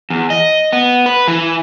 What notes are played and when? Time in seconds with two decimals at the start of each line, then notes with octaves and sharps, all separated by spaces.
0.10 E2
0.30 D#5
0.73 B3
1.06 B4
1.27 E3